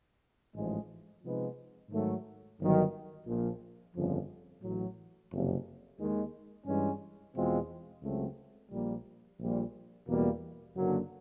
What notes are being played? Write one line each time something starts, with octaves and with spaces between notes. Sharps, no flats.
A1 G#2 F3 G#3
C3 F3 G#3 B3 D#4
G#2 D#3 F#3 A3
G1 G2 D#3 F#3
A#1 A#2 F3
G1 F2 C#3 F3
A1 A2 F#3
F#1 F2 C3
D#2 D#3 G#3
G2 E3 G#3 C#4
E2 B2 G#3 C4 F4
C#2 C#3 F#3 A3 C4
A#1 A#2 G3 A#3
A#1 A#2 G3
E2 B2 G3 A#3
F#1 F#2 D3 F#3 A#3